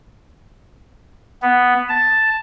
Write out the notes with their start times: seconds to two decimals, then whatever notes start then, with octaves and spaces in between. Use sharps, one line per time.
1.42 B3
1.89 A5